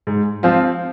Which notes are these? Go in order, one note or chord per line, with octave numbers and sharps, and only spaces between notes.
G#2
F3 C4 F4